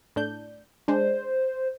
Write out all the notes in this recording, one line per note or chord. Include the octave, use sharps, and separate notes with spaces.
A2 D4 G6
G#3 D4 C5